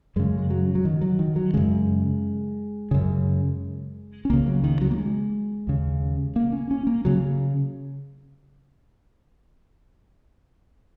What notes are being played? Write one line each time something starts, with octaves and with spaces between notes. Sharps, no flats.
F#2 C#3 G#3
G#3
F#3
F#3
D#3
F#3
D#3
F#3
F#2 C#3 G#3
F#2 C#3
C#4
C#2 C#3 A#3
F#3
D#3
F#3
A#3
G#3
D#2 C#3
A#3
C#4
C#4
A#3
C#3 F#3